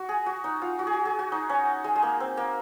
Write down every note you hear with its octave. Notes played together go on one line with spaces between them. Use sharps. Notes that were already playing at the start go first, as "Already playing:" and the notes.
Already playing: F#4
G#4
F#4
D#4
F4
F#4
G#4
F#4
G#4
F#4
D#4
C#4
G#3
G#3
A#3
C4
A#3